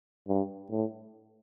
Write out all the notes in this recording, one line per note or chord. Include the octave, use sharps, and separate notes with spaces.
G2
A2